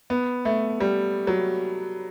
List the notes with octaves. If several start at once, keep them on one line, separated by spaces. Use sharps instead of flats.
B3
A3
G3
F#3